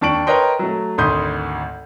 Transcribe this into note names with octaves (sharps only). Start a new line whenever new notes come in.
D#2 D4 A5 C#6 D7 F#7
A#4 B4 C#5 D#5 G5 C6
F#3 A3
G#1 D2 B5 C6 D#6 G6